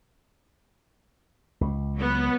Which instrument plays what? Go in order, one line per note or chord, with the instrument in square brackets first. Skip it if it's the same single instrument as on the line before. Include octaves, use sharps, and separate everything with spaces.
[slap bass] C#2
[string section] F#3 B3